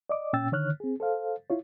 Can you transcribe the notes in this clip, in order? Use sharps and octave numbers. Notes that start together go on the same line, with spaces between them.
D5 D#5 D6
A#2 C#4 G5 E6 A6
D3 D#3 C#5 F6 F#6
C4 G#4
A4 C5 F5
E4 F4 C#5